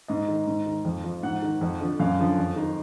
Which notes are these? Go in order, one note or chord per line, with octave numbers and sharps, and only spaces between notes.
G#2 D#5
D#3
G#2
D#3
F2
F3
G#2 F#5
D#3
F2
D3 F3
F#2 F5
D3 F3
F2
D#3